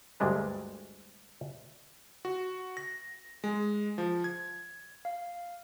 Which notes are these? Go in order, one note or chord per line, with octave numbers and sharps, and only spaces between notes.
D2 G2 G3 G#3 D4 B4
F#4
A#6
G#3
F3
G#6
F5